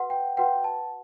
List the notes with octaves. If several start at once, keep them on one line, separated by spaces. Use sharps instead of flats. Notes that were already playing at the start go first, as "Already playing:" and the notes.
Already playing: F#4 B4 F#5
G5
F#4 B4 F#5 G5
A5